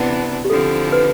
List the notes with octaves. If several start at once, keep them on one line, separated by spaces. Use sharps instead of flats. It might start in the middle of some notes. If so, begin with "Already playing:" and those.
Already playing: C3 E3 B3 D4
G4
D3 F3 C4 E4 A4
B4